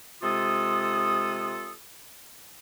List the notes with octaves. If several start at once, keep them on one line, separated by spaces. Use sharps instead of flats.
C3 G#3 F4 A4 D#6